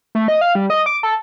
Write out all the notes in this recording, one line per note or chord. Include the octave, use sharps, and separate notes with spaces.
A3
D#5
F5
G3
D#5
D6
A4